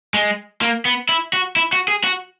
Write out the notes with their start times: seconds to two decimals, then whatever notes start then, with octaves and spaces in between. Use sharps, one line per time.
0.14 G#3
0.62 A#3
0.85 B3
1.09 E4
1.33 F#4
1.56 E4
1.73 F#4
1.88 G#4
2.04 F#4